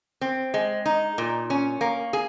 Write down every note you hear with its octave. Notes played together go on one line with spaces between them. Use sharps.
C4
G#3
D#4
A#2
C#4
A#3
G#4